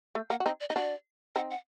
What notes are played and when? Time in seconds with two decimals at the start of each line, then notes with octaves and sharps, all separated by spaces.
0.15 A3
0.30 A#3 F#5
0.40 F#4
0.45 C4 D#4 D#5
0.60 D5
0.70 D#4 D#5
0.75 D4 F#4 D5
1.36 C4 D#4 F#5
1.50 F#5